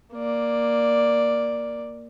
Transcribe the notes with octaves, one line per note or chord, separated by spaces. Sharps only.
A#3 D5